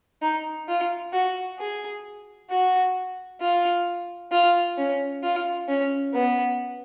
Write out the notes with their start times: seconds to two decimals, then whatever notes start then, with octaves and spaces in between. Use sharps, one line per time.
0.22 D#4
0.68 F4
1.13 F#4
1.59 G#4
2.50 F#4
3.40 F4
4.32 F4
4.77 C#4
5.23 F4
5.68 C#4
6.13 B3